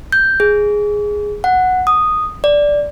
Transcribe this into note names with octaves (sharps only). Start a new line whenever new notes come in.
G6
G#4
F#5
D#6
D5